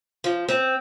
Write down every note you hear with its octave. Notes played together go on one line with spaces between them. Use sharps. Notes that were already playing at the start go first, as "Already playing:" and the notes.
F3
C4